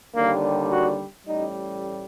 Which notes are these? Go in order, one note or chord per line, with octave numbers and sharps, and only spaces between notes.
D#2 D3 G3 A#3
F#4
A1 A2 G3 D#4